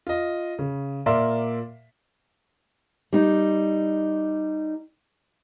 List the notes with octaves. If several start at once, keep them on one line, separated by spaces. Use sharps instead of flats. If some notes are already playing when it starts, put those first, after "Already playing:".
F4 D#5
C#3
A#2 A#4 D5 E5 C6
G3 D#4